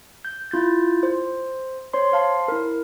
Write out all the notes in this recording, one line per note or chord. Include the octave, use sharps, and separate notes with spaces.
G6
E4 F4 G6 A6
C5
C5 C#5 C6
C5 F5 A5 C6
E4 A#4